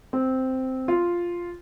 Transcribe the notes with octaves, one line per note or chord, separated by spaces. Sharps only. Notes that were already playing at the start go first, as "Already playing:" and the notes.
C4
F4